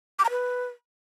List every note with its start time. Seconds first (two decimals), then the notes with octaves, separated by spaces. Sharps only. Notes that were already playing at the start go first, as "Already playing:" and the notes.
0.19 D6
0.25 A#5
0.30 B4